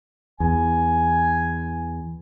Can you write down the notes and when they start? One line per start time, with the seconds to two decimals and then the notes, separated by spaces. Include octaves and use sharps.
0.40 E2 G#5